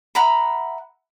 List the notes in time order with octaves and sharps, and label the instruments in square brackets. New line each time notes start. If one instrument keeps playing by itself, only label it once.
[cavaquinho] E5 F#5 A#5 B5